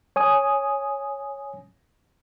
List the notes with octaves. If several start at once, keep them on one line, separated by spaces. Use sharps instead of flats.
C#5 G#5 D#6